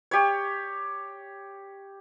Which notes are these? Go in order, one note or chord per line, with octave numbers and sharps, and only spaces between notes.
G4 C#5